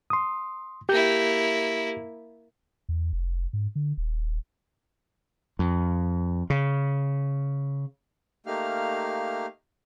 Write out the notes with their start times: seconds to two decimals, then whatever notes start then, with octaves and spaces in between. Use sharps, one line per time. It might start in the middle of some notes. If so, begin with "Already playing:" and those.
0.10 C6 D#6
0.89 A#3 E4 G4 G6
2.89 E2
3.13 F1
3.53 G#2
3.75 D3
3.97 D#1
5.59 F2
6.50 C#3
8.46 A3 A#3 D#4 G4 F5 F6